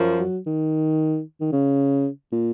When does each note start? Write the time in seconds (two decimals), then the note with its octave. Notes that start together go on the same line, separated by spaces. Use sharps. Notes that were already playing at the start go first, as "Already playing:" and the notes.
Already playing: F#2 F3
0.19 F#3
0.46 D#3
1.41 D#3
1.52 C#3
2.32 A#2